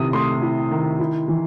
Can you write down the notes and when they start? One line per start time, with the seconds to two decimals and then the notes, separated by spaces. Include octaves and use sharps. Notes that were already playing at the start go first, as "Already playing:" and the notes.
Already playing: C3 D#3 E4 D#6
0.13 A3 C6
0.42 E4
0.71 D#3
1.00 E4
1.28 E3